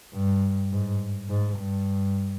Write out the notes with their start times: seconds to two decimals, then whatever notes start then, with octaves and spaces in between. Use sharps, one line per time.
0.14 G2
0.71 G#2
1.29 G#2
1.58 G2